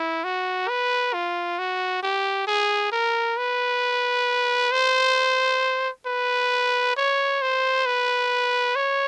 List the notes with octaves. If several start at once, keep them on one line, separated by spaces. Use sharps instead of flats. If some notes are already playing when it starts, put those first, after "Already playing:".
Already playing: E4
F#4
B4
F4
F#4
G4
G#4
A#4
B4
C5
B4
C#5
C5
B4
C#5